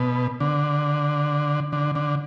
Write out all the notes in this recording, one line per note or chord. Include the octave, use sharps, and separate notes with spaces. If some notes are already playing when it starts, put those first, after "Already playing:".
Already playing: B2
D3
D3
D3